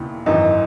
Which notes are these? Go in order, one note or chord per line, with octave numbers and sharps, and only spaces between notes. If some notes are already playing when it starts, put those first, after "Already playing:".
Already playing: E1 D#2 C#3 E3
G#1 F#2 E3 D#4